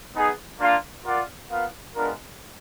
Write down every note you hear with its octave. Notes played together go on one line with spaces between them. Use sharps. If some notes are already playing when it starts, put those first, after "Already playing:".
B3 D#4 G#4
A#3 D4 F4
F4 A#4 D5 F#5
B3 F4 A#4 F5
G#3 B3 D4 F4 A#4